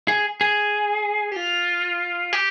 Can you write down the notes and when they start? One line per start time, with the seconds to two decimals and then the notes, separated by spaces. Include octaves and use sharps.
0.08 G#4
0.41 G#4
1.32 G4
1.36 F4
2.33 G4